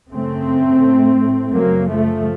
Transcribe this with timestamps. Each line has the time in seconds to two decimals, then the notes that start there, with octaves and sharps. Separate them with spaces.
0.10 F#2 C#3 A3 C4
0.82 A2
1.53 F#2 C#3 F#3 A#3
1.88 F3 A3